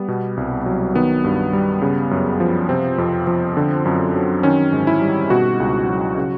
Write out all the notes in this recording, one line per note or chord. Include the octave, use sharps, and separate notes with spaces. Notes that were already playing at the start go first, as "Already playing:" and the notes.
Already playing: G3 B3
B2
C2
F#3
D#3 B3
G2
G3
C#3
F#2
F3
C3 C4
F2
F3
D3
F#2
F#3
D#3 C#4
G#2
E4
G3
B2 F#4
C#2
F#3
C#3